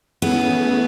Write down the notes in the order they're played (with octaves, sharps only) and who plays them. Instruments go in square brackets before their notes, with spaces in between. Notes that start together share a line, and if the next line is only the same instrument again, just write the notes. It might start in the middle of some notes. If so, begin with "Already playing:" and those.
[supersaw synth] E3 A3 C#4 E4 G#4 [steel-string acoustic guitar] B3